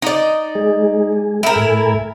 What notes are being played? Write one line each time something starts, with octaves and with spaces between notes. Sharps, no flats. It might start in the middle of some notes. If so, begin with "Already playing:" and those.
D#4 D5
G#3 G#4
E4 A#4 G5
A2 A4 G#5